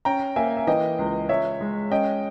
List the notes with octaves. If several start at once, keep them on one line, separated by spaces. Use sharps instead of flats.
C#4 G5 A#5
A#3 E5 G#5
E5
E3 D#5 G5
C#2
C#2 C#5 E5
G#3
C#4 D#5 G5